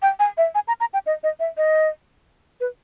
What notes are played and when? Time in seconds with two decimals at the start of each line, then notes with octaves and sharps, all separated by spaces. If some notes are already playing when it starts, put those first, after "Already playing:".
0.02 G5
0.19 G#5
0.38 E5
0.55 G#5
0.68 A#5
0.80 A#5
0.94 G5
1.06 D#5
1.23 D#5
1.40 E5
1.57 D#5
2.60 B4